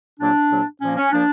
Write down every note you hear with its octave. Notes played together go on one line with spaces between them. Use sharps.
C2 A#2 F#3 A#3 D4
C2 A#2 F#3 A#3
A#2 F3 A#3 C#4
C#4
A#2 F3 A#3 D4